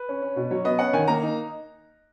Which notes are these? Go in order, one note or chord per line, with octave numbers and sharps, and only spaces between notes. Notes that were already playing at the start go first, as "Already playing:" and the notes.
Already playing: B4
C#4
C#4
B2
F#3 C#5
B3 D#5
C#4 F#5
D#3 G#5
A#3 A#5
D#4